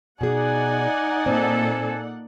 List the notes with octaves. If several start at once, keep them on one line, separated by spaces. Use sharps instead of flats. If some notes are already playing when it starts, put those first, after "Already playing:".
B2 D#4 G#4 D5 F#5 G#5
A#2 C4 A4